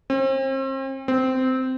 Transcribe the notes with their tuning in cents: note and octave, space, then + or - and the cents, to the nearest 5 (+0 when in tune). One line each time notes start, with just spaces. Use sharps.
C4 +40
C4 -15